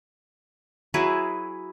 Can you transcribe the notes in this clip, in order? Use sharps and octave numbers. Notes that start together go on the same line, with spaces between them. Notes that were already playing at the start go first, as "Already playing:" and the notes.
F#3 E4 G#4 B4